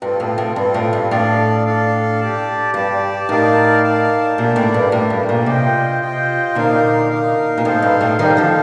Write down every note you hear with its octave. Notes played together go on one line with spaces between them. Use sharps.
G2 C4 F4 A4
A2
A2
G2 C4 F4 A4
A2
G2
A2 D4 A4 D5 F5
D4 A4 D5 F5
G4 D5 A5
G2 G4 D5 A5
A2 D#4 A#4 D5 F5 A5
D#4 A#4 D5 F5 A5
A#2 A3 D4 G4 A#4 D5
A2
G2
A2 A3 D4 G4 A#4 D5
G2
A#2
C3 F4 C5 D#5 G5
F4 C5 D#5 G5
A#2 D3 D#4 A#4 F5
D#4 A#4 F5
A#2
A2 D#4 A4 C5 F5
G2
A2
D#3 G3 D#4 A4 C5 F5
D3 F3